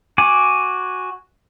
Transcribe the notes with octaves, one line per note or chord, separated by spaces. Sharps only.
F#4 G#5 D6